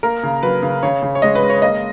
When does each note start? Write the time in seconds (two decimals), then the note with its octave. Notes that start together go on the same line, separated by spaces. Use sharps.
0.03 A#3 A#4
0.23 C#3
0.43 F#3 B4
0.63 C#3
0.83 C#3 C#5
1.03 C#3
1.15 C#5
1.22 G#3 D#5
1.35 B4
1.42 G#3
1.50 C#5
1.62 A#3 D#5